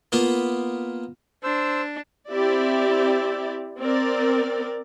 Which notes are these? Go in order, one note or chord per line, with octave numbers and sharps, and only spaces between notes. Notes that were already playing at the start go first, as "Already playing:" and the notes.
A#3 B3 F4
D4 C5 E6
C4 E4 G4 D5 E5
C4 A#4 D5